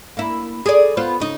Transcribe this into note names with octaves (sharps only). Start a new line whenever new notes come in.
A#3 E4
G#4 A4 D5
B3 F4 C5
C#3 D#4